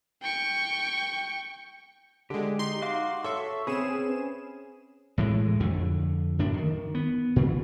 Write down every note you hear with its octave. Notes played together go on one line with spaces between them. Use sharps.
G5 C#6
D3 G#3 G4
D#4 C6
F#4 F5 D6
A4 C#5 E5 C#6
C4 C#4 G#4 B4 E7
A2 E3 G#3
F2 D3
F#2 A2 D4
D#3
B3
A#2